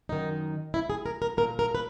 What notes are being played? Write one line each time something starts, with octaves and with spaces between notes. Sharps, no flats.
F#2 D#3 D#4
E4
G#4
A#4
A#4
A#2 A#4
A#4
B4